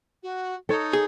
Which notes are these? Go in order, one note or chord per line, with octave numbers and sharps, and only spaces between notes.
F#4
D#4 A4 C#5
G#4